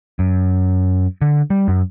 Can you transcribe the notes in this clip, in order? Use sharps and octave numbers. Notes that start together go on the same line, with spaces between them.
F#2
D3
G3
F#2